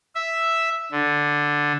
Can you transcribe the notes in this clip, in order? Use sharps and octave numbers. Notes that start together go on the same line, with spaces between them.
E5
D3